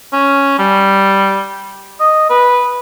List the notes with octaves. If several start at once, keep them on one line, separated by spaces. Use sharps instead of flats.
C#4
G3
D#5
B4